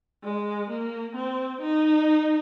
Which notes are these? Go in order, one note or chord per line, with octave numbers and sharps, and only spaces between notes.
G#3
A#3
C4
D#4